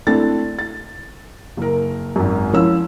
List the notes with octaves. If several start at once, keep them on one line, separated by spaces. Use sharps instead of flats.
A3 C4 D4 E4 A6
A6
F#1 A#4
G#1 F#2
F3 C#4 E4 E6